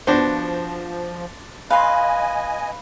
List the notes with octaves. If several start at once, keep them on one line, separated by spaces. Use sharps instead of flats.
F3 B3 D4 F#4 C5
B4 D#5 F5 G#5 C6